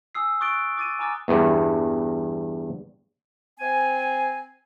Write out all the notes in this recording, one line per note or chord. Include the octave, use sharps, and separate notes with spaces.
G#5 D#6 E6 C7
C#6 D#6 F#6 A6 D7 G7
D6 A6 D#7
G#5 A#5 D6 F6 A6
E2 G2
C4 G#5